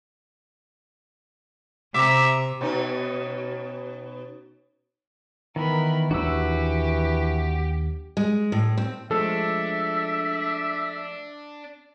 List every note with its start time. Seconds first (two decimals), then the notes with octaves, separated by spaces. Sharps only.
1.94 C3 E5 A#5 D6
2.61 B2 C#4 D#4
5.56 D#3 E3 B3 A#4 B5
6.11 D#2 E3 F#3 D4 F#4 G4 E6
8.17 G#3
8.52 A2
8.77 C4
9.11 F3 G#3 A3 D4 A4 E5